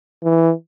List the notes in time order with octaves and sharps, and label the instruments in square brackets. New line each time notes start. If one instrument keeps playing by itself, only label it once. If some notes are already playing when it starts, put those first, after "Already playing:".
[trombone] E3